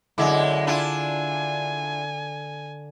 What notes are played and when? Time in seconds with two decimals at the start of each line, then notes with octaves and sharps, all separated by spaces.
0.18 F#2 D3 G#3 E4
0.67 D4 E4 F4 G#5